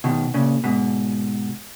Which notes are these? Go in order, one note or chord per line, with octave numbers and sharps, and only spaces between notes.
B2 D#3
A#2 C#3
G#2 B2